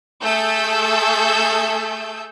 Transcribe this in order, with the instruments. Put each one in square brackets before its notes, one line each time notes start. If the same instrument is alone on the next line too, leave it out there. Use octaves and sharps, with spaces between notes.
[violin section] A3 G#4 A4 E6 G6